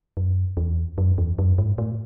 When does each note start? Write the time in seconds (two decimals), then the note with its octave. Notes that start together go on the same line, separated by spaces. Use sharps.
0.17 F#2
0.57 E2
0.98 F#2
1.18 E2
1.39 F#2
1.58 G#2
1.78 A2